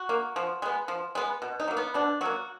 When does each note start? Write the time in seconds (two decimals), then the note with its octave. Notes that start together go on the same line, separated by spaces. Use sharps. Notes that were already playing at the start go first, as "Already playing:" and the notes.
Already playing: F#4
0.09 A#3
0.36 F3
0.62 G#3 B3
0.88 F3
1.15 G#3 B3
1.42 B2
1.60 D#4
1.68 F#3 A#3
1.77 B3
1.94 B2 D4
2.21 F#3 A#3 F#4